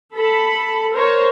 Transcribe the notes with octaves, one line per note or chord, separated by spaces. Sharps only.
A4 B5
A#4 C5 C#5